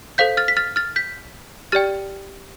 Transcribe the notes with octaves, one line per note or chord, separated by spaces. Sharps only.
A4 C5 F5 G6 B6
F6 A6
B6
F6 A6
F6 A6
G6 B6
G4 D5 G5 F6 A6